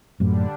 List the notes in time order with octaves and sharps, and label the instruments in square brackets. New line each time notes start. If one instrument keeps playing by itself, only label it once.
[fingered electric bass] F#2 A2 [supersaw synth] D3 G3 D4